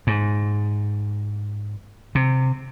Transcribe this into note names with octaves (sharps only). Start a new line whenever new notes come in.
G#2
C3